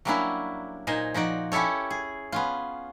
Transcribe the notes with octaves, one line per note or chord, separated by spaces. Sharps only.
F#3 G3 A#3 C#4 D4 E4
A#2 D#4 C5 G#5
F3 D#4 F#4 D5
C#4 E4 G4 A4 C#5
G#4
B3 C#4 F4